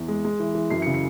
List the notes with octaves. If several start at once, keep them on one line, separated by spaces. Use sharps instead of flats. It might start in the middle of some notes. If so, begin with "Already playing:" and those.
Already playing: E2
G#3
G#3
E3
E3
F#2 C7
C#7
C#3
C#7